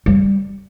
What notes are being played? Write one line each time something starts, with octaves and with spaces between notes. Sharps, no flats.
G3